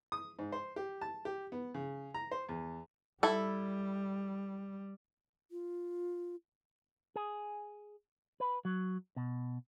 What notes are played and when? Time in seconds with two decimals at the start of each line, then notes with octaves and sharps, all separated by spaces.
0.12 D#6
0.39 G#2
0.52 C5
0.76 G4
1.01 A5
1.25 G4
1.52 B3
1.74 C#3
2.14 A#5
2.31 C5
2.49 E2
3.23 G3 E4 A4
5.51 F4
7.16 G#4
8.40 B4
8.65 F#3
9.16 B2